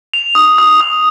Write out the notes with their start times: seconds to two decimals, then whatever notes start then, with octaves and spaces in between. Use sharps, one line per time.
0.14 F7
0.35 D#6
0.58 D#6
0.81 D#6